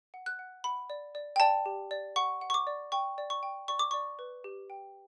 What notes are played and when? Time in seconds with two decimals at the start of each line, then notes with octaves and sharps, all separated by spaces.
0.14 F#5
0.26 F#6
0.39 F#5
0.64 F#5 B5
0.90 D5
1.15 D5
1.36 G5
1.40 D5 A5
1.66 G4
1.91 D5
2.16 F#5 C#6
2.41 F#5
2.50 C#6
2.54 D6
2.67 D5
2.92 G5 C#6
3.18 D5
3.30 C#6
3.43 G5
3.68 D5 C#6
3.79 D6
3.91 D5 C#6
4.19 B4
4.44 G4
4.70 G5